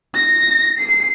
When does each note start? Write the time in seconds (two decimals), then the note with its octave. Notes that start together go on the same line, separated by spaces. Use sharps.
0.14 A#6
0.78 C7